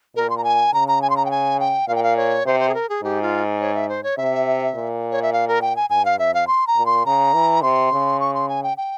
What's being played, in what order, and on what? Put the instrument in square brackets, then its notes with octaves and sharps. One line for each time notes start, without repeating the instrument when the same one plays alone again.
[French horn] A#2 [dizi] A#4
[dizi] C6
A#5
G#5
[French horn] C#3 [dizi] A#5
[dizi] A#5
G#5
C6
A#5
G5
G#5
G5
[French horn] A#2 [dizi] F5
[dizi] G5
F5
C#5
[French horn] C3 [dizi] C5
[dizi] C5
G#4
A#4
G#4
[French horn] G#2 [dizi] G4
[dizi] F4
C#5
E5
C5
C#5
[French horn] C3 [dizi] E5
[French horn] A#2
[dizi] C#5
E5
F5
A#4
G5
G#5
[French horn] G2 [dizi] G#5
[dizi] F5
[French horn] F2 [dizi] E5
[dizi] F5
C6
A#5
[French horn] A#2
[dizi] C6
[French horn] C#3 [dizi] A#5
[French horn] E3
[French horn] C3 [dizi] C6
[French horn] C#3
[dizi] C#6
C6
G#5
G5
G5